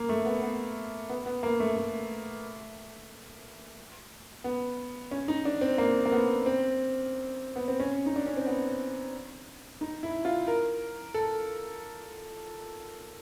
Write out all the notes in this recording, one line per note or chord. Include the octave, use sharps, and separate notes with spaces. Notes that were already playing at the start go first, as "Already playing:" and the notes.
Already playing: A#3
A3
B3
B3
B3
B3
A#3
A3
A3
B3
C#4
D#4
D4
C4
A#3
A#3
B3
C4
B3
C4
C#4
D#4
D4
C#4
C4
B3
D#4
E4
F4
A#4
A4